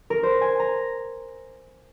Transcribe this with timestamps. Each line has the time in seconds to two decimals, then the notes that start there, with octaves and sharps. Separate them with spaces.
0.10 A#4
0.23 C5
0.41 G#5
0.59 A#5